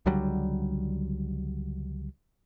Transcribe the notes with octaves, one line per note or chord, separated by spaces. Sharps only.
C#2 D3 F#3 G3